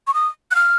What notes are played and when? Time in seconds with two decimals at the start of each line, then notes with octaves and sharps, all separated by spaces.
0.07 C#6
0.14 D#6
0.51 F#6
0.55 F6